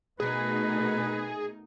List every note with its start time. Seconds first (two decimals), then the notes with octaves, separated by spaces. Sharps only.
0.20 B2 A3 D#4 G#4 A#4 B4